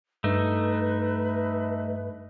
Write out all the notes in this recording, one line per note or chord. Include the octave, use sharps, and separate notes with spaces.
G2 A3 D#4 B4